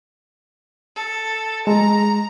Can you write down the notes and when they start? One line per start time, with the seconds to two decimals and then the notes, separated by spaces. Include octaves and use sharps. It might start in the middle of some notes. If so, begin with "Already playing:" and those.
0.96 A4
1.67 G#3 A#5